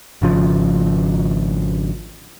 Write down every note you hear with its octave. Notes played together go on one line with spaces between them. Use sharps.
G#1 C#3 F3